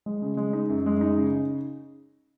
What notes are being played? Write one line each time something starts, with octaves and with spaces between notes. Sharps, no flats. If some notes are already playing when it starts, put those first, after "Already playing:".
G#3
C#3
G#3
D#4
F#2
G#3
D#4
C#3